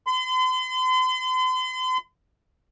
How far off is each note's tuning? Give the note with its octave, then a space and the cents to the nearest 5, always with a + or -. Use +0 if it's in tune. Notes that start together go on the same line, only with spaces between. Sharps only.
C6 -40